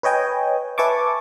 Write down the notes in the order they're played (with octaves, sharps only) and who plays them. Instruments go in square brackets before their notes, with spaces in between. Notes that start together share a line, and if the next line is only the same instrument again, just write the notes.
[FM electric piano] B4 C#5 D#5 G5 G#5
B4 E5 G#5 A5 C#6 D6